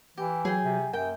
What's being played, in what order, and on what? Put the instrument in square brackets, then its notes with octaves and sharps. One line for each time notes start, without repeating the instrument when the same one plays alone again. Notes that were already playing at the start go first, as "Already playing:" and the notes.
[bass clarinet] E3 [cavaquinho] G4
[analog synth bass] F#3 [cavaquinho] G#4 G5
[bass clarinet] C3
[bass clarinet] F#2 [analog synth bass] A#3 [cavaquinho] G5